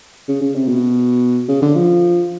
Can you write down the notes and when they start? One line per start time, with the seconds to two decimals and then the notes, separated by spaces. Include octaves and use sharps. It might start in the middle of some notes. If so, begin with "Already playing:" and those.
0.28 C#3
0.42 C#3
0.55 C3
0.68 B2
1.48 C#3
1.62 D3
1.76 F3